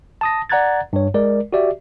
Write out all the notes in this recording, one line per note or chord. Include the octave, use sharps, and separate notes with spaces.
A5 D#6 A#6
D5 F#5 A#5 F#6 G#6 A6
G2 C#5
G#3 A#4 D5
F#4 G4 D5 E5